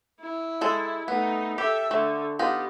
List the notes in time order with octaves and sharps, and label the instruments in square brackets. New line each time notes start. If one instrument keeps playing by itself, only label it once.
[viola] E4
[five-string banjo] G#3 A4
[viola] A3 D#4 [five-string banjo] B3
[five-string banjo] G4 [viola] A4 E5
[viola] D3 [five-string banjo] A3
[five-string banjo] B3 D#4 F4 [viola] G4